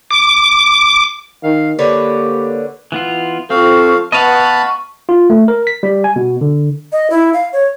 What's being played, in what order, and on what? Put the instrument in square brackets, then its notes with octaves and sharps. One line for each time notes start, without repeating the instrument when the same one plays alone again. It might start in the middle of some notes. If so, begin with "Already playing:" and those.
[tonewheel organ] D6
[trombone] D#3 [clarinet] F5
[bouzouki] D3 B4 C#5 [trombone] A#3 [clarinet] G4
[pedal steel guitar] E3 B3 F4
[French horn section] F3 F4 A4 [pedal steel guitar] C4 [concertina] F5 [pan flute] C#6
[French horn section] B3 [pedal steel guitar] D#5 F5 F#5 [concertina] A5 B5 [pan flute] C#6
[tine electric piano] F4
A3
A#4
B6
G3
G#5
B2
D3
[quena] D#5
E4
F5
C#5